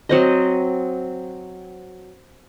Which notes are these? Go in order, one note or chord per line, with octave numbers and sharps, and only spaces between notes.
F#3 C4 D#5